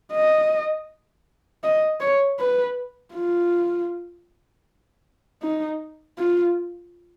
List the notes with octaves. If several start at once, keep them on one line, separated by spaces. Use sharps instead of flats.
D#5
D#5
C#5
B4
F4
D#4
F4